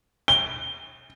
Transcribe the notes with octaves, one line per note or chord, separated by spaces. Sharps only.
G7